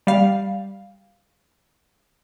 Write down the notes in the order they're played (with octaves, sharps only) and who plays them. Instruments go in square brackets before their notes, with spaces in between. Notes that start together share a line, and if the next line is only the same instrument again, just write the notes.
[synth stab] G3 F5